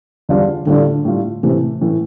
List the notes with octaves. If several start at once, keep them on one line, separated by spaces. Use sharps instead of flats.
E2 D3 G3 D4 F4
A2 D3 G3 D4 F4
A2 G3 D4 F4
A2 C3 E3 A3
A2 E3 A3